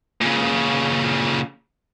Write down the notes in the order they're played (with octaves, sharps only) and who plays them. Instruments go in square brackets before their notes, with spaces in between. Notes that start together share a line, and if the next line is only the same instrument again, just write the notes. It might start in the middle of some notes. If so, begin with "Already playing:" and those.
[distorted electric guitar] A#2 C#3